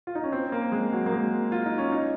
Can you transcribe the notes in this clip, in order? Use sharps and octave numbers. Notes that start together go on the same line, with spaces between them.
F4
D#4
C#4
C4
A#3
G#3
F#3
A#3
G#3
F4
D#4
C#4
D#4